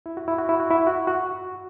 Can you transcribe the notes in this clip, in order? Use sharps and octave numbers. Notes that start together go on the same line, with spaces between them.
E4
F#4
E4
F#4
E4
F#4
E4
F#4
F#4